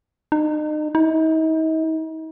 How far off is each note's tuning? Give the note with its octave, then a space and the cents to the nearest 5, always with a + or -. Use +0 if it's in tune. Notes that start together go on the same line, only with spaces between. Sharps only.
D#4 -35
D#4 +40